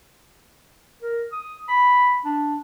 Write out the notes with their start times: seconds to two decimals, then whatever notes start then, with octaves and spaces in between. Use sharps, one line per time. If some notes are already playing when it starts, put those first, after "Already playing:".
1.02 A#4
1.32 D#6
1.68 B5
2.25 D4